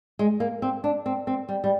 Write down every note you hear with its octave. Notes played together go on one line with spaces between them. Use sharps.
G#3
A#3
C4
D4
C4
C4
G3
G3